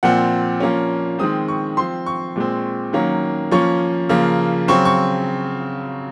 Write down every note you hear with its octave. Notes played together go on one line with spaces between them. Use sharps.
A#2 F3 C4 F#5
F3 A#3 C#4
D#3 G#3 C4 D#6
C#6
F3 C4 C6
C#6
A#2 G#3 C4
D#3 F#3 A#3 C#4
F3 A#3 C#4 C#6
C#3 F3 A#3
C#3 F#3 C4 C#6
C#6